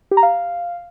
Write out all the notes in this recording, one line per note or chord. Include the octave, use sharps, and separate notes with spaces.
G4
A#5
F5